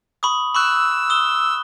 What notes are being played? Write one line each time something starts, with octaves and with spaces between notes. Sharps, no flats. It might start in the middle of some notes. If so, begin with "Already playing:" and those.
B5 C#6 D#6
B5 C#6 E6 F#6
D#6 G7